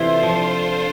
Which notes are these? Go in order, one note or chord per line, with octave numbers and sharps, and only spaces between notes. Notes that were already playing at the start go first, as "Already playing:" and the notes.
Already playing: C3 E3 D4 F4 A4 C5
F3